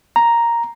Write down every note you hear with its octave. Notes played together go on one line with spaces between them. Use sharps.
A#5